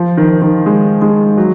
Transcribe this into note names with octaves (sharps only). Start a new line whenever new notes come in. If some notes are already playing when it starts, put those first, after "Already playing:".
Already playing: F3
D#3
D#3
G#3
G#3
F#3